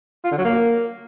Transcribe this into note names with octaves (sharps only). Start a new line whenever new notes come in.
F4
D3
F#3
A#3